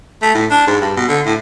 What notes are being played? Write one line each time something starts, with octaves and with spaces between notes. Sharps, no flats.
A3
A2
D4
G#2
G2
B2
D3
A2